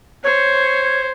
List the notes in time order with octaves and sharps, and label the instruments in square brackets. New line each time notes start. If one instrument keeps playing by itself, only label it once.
[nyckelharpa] C5 [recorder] C#5